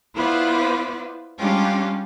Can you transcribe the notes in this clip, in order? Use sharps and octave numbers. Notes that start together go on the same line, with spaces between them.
B3 E4 F4 B4 C5 D5
G3 G#3 C#4 D4 F4 G4